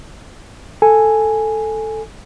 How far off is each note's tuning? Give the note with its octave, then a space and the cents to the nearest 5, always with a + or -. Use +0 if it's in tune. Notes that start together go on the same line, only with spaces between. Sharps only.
A4 +0 G#5 +0